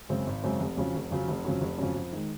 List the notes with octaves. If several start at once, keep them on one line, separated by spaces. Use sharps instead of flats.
F#2 C#3 G#3 C4
G#1
F#2 C#3 G#3 C4
F1
F2 C#3 F#3 C#4
F1
F2 C#3 F#3 C#4
F1
F2 C#3 F#3 C#4
F1
F2 C#3 F#3 C#4
F2
D#3 G#3